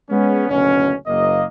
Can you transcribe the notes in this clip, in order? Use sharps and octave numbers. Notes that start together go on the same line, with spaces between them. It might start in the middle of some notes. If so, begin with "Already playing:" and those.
G#3 B3 C#4
F#1 D2 B2 C#4
F#1 A#3 D#5